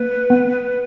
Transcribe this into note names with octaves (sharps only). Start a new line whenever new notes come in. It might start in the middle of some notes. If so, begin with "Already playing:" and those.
Already playing: A#3 B4
B3